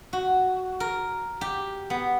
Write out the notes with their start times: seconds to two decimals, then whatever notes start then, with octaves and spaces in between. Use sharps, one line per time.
0.13 F#4
0.80 A#4
1.41 G4
1.90 B3